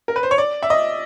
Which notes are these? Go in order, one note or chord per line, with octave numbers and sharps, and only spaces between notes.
A#4
B4
C5
C#5
D5
E5
D#5